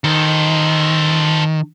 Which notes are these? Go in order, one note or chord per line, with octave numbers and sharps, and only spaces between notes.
D#3 A4 C5